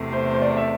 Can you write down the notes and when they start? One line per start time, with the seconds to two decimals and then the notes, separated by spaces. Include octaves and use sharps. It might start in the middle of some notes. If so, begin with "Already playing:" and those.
Already playing: E2 C3 A3
0.13 C5
0.34 C5
0.42 D5
0.57 E5